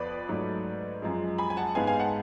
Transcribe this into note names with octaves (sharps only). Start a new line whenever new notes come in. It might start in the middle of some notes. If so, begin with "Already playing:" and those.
Already playing: F2 F3 B3 B4 D5
G#2 F#3 A3
F#2 F3 G#3
G#5 B5
G#5
F#5 A5
G#2 G#3 B3 F5 G#5
F5 G#5
F#5 A5